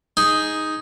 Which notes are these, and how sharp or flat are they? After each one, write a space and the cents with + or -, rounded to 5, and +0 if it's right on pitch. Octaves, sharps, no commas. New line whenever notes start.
D#4 +5 G#4 +0